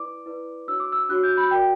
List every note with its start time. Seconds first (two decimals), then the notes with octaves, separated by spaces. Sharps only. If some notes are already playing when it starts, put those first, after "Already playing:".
Already playing: E4 B4 D5 D6
0.26 E4 B4 D5
0.67 D4 F#4 C#5 E6
0.80 D6
0.92 E6
1.09 D4 F#4 C#5 F#6
1.23 G6
1.37 B5
1.51 F#4 A#4 D5 G5